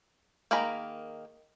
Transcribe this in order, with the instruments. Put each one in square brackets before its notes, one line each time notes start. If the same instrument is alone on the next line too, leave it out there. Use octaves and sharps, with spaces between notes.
[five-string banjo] D#3 A#3 G#4 A#5 B5